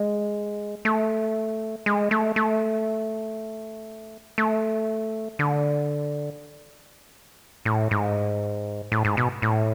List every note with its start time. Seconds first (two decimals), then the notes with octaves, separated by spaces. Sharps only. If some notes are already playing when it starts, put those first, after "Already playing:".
Already playing: G#3
0.85 A3
1.86 G#3
2.11 A3
2.36 A3
4.38 A3
5.39 D3
7.65 A2
7.91 G#2
8.92 A2
9.05 G#2
9.17 B2
9.42 A2